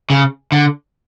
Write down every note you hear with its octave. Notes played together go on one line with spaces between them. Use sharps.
C#3
D3